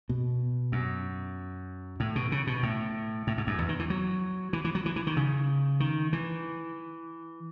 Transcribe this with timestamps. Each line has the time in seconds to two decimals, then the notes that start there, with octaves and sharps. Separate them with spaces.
0.09 B2
0.72 F#2
2.00 A2
2.16 B2
2.32 C#3
2.47 B2
2.63 A2
3.27 A2
3.38 G#2
3.47 F#2
3.59 E2
3.69 D#3
3.79 E3
3.90 F#3
4.53 E3
4.64 E3
4.75 F#3
4.86 E3
4.96 E3
5.07 D#3
5.17 C#3
5.80 D#3
6.13 E3